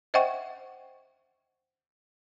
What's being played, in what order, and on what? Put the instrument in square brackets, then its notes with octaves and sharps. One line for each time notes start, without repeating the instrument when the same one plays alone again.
[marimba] C5 D#5 E5 F#5 G5 C#6